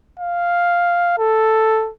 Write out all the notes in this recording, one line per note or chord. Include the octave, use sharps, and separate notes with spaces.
F5
A4